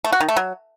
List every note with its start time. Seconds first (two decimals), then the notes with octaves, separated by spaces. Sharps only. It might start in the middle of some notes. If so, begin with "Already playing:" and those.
0.04 A3
0.12 F#4
0.20 D#3
0.28 A3
0.37 F#3